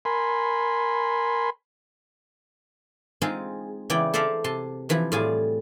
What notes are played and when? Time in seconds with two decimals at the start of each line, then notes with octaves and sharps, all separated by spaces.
0.05 A#4 G#5 B5 C6
3.22 G#3 C4 D#4 F4 G#4
3.90 C#3 E3 B3 E4 D5 G5
4.14 A4 C5 D5 E5 F5 A#5
4.44 C3 A5 C6
4.89 C3 E3 F3 E4
5.12 A2 G3 F4 G#4 G#5